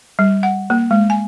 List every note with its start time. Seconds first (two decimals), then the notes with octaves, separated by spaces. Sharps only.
0.19 G3
0.43 F#5
0.70 A#3
0.91 G#3
1.10 G#5